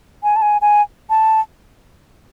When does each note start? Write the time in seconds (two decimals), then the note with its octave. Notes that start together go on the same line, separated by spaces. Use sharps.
0.23 G#5
0.36 A5
0.42 G#5
0.62 G#5
1.10 A5